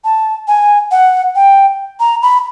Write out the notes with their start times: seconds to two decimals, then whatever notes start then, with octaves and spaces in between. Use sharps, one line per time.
0.05 A5
0.48 G#5
0.91 F#5
1.35 G5
2.00 A#5
2.22 B5